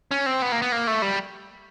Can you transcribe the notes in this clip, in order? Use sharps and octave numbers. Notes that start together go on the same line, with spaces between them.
C#4
C4
B3
A#3
B3
A#3
A3
G3